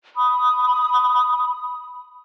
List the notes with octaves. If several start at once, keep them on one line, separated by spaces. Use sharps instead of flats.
B5 D#6